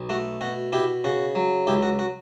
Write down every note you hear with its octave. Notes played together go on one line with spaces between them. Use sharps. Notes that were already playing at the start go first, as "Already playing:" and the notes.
Already playing: B1
A3 F#4
B2 F#4
B2 E4 G4
C#3 F#4
F#3
C#2 E4 G4
F#4
F#4